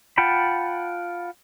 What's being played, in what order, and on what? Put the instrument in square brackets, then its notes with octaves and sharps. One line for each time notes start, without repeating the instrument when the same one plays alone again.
[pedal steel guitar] F4 F#5 G5 A5 B5